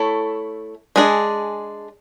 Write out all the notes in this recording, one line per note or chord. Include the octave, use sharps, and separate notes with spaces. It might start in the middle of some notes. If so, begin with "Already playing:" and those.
Already playing: A3 E4 A4 C#5
G#3 D4 G#4